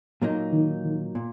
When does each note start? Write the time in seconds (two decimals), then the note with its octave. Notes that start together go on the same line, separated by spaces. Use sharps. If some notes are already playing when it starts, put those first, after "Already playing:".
0.22 A#2 F#3 A#3 D#4
0.53 D#3
0.84 D#3
1.15 A#2